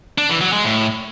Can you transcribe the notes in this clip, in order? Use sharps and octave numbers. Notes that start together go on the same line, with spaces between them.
D4
E3
F#3
G#3
A2